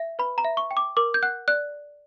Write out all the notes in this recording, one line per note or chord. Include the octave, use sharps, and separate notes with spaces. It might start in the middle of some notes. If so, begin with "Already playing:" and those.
Already playing: E5
B4 B5
A#5
E5
C#6
G5
D6
A#4 D6
G6
F#5 F#6
D5 F#6